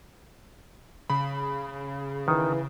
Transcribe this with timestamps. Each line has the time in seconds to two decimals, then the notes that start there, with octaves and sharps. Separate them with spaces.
1.10 C#3 B5
2.28 D#3 E3